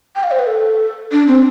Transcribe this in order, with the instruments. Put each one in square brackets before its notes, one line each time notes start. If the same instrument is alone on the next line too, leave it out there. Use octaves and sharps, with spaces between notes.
[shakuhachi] G5
F5
C5
B4
A4
D4
C4